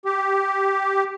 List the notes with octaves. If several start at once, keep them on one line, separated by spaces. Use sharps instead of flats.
G4